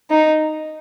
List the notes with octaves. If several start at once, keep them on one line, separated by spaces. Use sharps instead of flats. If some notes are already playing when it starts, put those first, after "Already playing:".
D#4